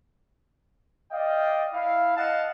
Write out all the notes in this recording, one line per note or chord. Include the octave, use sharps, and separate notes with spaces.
D5 D#5 F5 G5
E4 F5
D#5 F5 F#5 A5